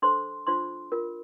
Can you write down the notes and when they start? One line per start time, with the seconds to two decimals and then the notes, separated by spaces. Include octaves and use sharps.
0.02 D4 A4 C5 C6
0.47 D4 F4 C5 C6
0.92 F4 A#4